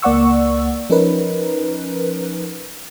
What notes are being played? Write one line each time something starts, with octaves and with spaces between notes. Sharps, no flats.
C#2 A#3 D5 F#5 C#6 E6
F3 C#4 D#4 A#4 B4